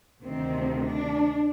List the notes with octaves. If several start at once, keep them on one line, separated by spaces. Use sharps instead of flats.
D2 C3 D#3 C4
D4